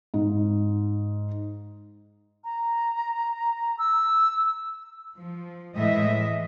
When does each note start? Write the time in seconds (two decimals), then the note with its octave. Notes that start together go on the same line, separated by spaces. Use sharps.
0.14 G#2
2.44 A#5
3.79 E6
5.15 F3
5.77 A2 E3 G#3 D#5 E5